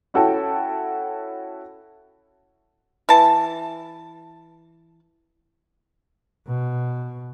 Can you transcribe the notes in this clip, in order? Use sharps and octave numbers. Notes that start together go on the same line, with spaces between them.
C#4 E4 F#4 A4 G5 A5
E3 A5
B2